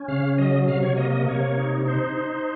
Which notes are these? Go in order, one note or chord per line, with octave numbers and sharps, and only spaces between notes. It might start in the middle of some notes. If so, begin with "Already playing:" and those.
Already playing: C#4
C#3 F5
F#3 D#5
C3 F5
C#5
A#3 D#5
D#5
C3 C#5
D#4
D#4 C5
D#4